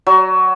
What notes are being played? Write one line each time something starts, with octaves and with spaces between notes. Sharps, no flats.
F#3